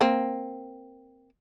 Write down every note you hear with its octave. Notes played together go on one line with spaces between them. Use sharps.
A#3 C4